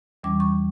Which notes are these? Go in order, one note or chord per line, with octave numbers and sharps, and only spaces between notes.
E2 E3 G3 C#4 D6
C#6